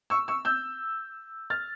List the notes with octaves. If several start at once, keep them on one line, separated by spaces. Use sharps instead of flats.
C#6 E6
C#6 E6
E6 G6
F6 A6